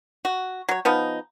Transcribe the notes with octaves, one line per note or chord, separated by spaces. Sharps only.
F#4
F#3 C#5
F3 B3 D#4